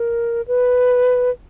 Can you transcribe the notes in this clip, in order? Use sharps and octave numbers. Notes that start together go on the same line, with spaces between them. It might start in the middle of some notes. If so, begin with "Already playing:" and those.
Already playing: A#4
B4